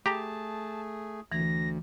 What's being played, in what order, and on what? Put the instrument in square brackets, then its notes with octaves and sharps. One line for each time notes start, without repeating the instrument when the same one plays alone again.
[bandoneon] A3 G#4 [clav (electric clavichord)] G4 A#5 [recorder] A5
[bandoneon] D2 [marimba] E3 [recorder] A#6